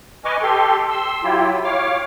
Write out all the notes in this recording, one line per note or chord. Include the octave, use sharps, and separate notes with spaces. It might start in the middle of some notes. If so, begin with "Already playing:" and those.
B4 D#5 G#5 C#6 D6 F6
G4 A4 C6
C6 E6
F#3 E4 F4 G4
C#5 F5 D6 F6